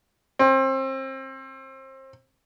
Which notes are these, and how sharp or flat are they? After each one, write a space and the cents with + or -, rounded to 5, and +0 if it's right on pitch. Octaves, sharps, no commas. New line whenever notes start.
C4 +30